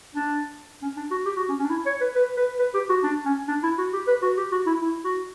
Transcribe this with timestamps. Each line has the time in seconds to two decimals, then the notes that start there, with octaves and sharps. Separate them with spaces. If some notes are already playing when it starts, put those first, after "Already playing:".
0.15 D4
0.82 C#4
0.97 D4
1.11 F#4
1.26 G4
1.37 F#4
1.49 C#4
1.59 C#4
1.65 D4
1.70 E4
1.86 C#5
2.01 B4
2.16 B4
2.37 B4
2.59 B4
2.74 G4
2.89 F#4
3.04 D4
3.26 C#4
3.48 D4
3.63 E4
3.78 F#4
3.93 G4
4.08 B4
4.23 F#4
4.37 G4
4.52 F#4
4.66 E4
4.82 E4
5.05 F#4